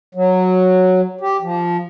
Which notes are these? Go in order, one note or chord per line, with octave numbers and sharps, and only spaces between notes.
F#3
G4
F3